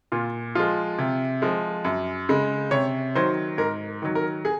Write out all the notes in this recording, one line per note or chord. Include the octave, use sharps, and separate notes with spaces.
A#2 F4
F3 G#3 F4
C3
F3 G#3
F#2
C#3 G#3
C3 C#5
D#3 F#3 C5
G#2 A#4
D#3 F#3
A#4
G#4